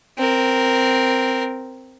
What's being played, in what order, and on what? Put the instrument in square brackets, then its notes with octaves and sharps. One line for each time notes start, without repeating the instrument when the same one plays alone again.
[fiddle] C4 A#4